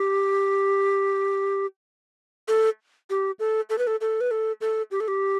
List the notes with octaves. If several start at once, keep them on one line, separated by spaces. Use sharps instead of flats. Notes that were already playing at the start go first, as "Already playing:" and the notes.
Already playing: G4
A4
G4
A4
A4
B4
A4
A4
B4
A4
A4
G4
A4
G4